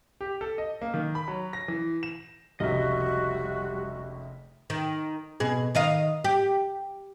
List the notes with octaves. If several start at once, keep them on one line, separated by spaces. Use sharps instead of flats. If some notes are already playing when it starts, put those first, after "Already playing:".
G4
A4
D#5
A#3
D#3
B5
F#3
A#6
E3
E7
F1 C#2 C3 G3 F#4 G4 D#5 E5
D#3
B2 G#4
D#3 D#5 F5
G4